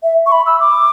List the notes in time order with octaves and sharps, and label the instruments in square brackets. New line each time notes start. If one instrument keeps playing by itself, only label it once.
[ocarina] E5
C#6
B5
E6
D6